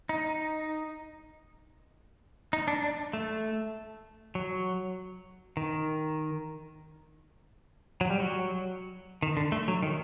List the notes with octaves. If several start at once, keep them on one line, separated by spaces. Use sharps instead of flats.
D#4
D#4
D4
D4
A3
F#3
D#3
F#3
G3
F#3
D#3
D3
A3
F#3
D#3